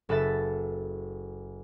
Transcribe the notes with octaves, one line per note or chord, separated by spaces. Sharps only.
F#1 A4 B4 E5 A6